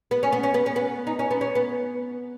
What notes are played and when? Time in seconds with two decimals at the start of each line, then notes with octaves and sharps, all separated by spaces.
0.11 B3
0.23 C#4
0.32 B3
0.43 C#4
0.54 B3
0.66 C#4
0.76 B3
1.07 D#4
1.19 C#4
1.31 B3
1.41 C#4
1.55 B3